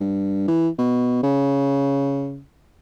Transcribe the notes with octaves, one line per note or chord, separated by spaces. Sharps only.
G2
E3
B2
C#3